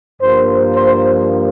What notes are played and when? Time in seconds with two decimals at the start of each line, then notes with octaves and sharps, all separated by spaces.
0.20 G2 F3 A#3 C5
0.75 C5